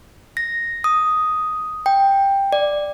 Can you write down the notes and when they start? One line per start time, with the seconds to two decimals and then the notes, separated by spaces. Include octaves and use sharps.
0.37 A#6
0.84 D#6
1.86 G5
2.52 D5